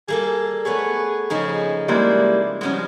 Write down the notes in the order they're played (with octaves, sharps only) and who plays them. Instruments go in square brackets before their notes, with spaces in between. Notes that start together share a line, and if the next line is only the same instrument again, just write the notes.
[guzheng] G3 A#3 A4 [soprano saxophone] G#4
[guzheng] A3 B3 C#5 [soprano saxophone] G#4
[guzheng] C#3 F3 D#4 [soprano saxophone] G#4
[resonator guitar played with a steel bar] G3 G#3 A#3 [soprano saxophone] E4
[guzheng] F3 G3 [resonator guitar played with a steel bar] G#3 C#4 [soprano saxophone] F#4